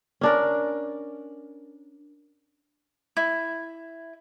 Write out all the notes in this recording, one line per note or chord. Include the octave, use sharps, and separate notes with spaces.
C#4 D4 A#4
E4